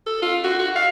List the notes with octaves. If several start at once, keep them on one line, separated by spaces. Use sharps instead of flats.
A4
F4
F#4
F#4
F5